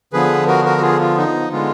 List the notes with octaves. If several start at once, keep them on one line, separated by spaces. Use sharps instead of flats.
D3 F3 B3 G#4 B4
F#4 A#4
F#4 A#4
F#4
F4 G#4
F4
D#4
D3 G#3 B3 F4